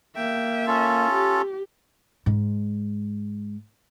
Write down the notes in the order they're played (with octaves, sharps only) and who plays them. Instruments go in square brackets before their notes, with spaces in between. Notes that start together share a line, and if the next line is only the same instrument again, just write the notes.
[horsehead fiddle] A#3 E5 [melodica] G5
[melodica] C#4 F4 A4
[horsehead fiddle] G4
[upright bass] G#2 G#3